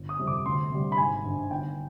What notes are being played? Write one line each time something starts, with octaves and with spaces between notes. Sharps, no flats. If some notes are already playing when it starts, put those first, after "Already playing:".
Already playing: G1
D#6
F2 C3 G3
D6
D2 C6
C3 G3
B5
G#1 G#5
G2 D#3
G1 G5